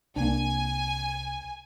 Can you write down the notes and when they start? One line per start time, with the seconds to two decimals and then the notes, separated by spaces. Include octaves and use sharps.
0.16 C2 A#3 D4 G#5